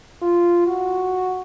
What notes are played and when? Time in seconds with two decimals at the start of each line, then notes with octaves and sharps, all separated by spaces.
0.22 F4
0.67 F#4